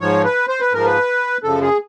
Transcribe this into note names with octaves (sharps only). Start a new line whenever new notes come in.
G#2 F3 C#5
B4
C5
B4
G#2 F3 A#4
B4
F#2 C#3 F3 A4
G#4